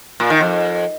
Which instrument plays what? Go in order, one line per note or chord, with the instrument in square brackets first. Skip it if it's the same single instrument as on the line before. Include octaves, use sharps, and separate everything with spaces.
[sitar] A#2
D#3
F2